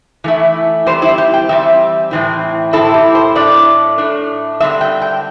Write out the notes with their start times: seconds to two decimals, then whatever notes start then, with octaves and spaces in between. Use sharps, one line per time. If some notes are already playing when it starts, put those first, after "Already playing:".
0.24 E3 A3 E4
0.86 E3 G3 C4 C5
1.02 E4
1.18 G4
1.34 G5
1.49 E3 G3 C4 E5
2.11 A2 E3 C4 E4
2.73 A2 E3 C4 E4 A4
2.94 G4
3.15 C5
3.35 A2 A3 D4 D5
3.98 A2 A3 D4
4.60 D3 G3 C4 E4 E5
4.81 G5
5.02 G5